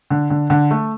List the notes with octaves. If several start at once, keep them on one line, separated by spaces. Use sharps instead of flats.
D3
D3
D3
A3